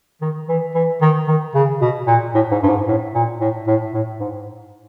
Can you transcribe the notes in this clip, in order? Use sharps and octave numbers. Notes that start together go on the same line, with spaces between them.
D#3
E3
E3
D#3
D#3
C#3
B2
A#2
A2
G#2
G2
G#2
A2
A#2
A2
A2
A2
G#2